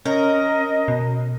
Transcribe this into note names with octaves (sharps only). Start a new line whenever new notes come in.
C#4 A#4 D#5
B2